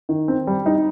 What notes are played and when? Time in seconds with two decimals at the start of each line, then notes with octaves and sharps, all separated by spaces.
0.09 D#3
0.28 C4
0.47 G3
0.66 D#4